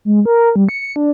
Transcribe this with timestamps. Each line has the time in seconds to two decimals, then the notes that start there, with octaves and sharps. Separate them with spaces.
0.05 G#3
0.26 A#4
0.56 G3
0.69 C#7
0.96 D4